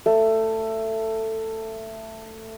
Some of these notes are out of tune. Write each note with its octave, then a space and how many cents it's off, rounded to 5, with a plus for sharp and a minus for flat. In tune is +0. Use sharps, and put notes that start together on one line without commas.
A3 +15